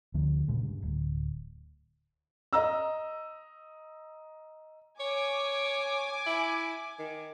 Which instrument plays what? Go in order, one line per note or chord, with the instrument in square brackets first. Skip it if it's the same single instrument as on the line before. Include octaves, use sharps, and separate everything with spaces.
[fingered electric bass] D2 D3 F3 B3
G1 A#2 C#3 G#3
G2
D1
[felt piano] D#5 A#5 E6
[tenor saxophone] C#5 [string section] G#5 D6
[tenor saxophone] E4
D#3